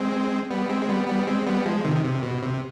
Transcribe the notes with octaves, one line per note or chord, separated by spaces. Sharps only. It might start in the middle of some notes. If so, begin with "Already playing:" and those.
Already playing: G#3 C4
G3 B3
G#3 C4
G#3
G3 B3
G3 B3
G#3 C4
G3 B3
F3 G#3
C3 D#3
C3
B2
C3